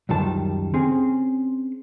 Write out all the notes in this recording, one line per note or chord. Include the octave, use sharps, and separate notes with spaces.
C#2 F#2 D#3 G3 A5
C4 C#4 G#4